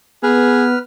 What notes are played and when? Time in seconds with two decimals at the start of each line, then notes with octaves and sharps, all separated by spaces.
0.23 B3 G#4 B4 F6